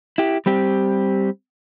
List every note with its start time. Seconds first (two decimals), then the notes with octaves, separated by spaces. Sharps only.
0.18 E4 G4
0.46 G3 C4 G4